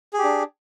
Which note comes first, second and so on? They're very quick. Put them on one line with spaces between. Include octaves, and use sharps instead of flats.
G#4 G4 D4